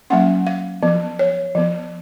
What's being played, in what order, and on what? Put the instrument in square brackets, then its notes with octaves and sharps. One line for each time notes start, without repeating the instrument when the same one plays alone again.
[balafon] F#3 A#3 C#4 F#5
F5
F3 B3
C#5
F3 B3